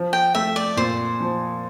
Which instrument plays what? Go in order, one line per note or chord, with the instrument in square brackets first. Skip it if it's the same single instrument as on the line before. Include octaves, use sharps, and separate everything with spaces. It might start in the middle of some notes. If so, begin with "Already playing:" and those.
Already playing: [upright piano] F3
[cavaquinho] G5
[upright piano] A3 [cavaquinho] E5
[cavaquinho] D5
[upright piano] A#2 [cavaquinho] C5
[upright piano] F3